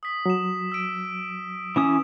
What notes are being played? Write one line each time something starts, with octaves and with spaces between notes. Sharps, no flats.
D#6 B6
F#3 D#6 E7
E6 D7
E3 C#4 D#6 E7